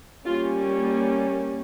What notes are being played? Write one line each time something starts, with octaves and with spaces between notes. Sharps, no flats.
G3 A#3 C#4 F4